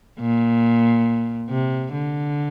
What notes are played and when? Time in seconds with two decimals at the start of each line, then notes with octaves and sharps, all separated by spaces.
0.20 A#2
1.50 C3
1.93 D3